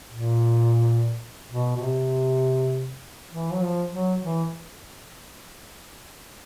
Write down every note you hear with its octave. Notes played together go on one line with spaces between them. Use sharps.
A#2
B2
B2
C3
E3
F#3
F3
F#3
E3